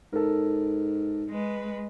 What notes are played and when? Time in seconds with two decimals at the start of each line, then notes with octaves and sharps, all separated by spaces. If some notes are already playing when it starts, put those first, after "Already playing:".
0.13 G#2 A4 A#4
1.29 G#3 B4